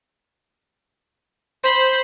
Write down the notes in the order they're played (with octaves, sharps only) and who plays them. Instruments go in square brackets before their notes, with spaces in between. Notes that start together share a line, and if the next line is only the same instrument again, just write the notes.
[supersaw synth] C5 [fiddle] B5